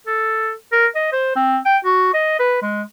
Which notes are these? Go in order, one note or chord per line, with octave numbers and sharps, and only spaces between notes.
A4
A#4
D#5
C5
C4
G5
F#4
D#5
B4
G#3